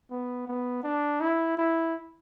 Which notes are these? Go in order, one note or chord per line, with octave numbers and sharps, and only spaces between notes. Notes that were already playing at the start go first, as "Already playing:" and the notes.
B3
B3
D4
E4
E4